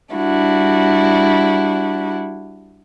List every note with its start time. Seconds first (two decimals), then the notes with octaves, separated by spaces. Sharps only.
0.13 G3 D4 E4 F#4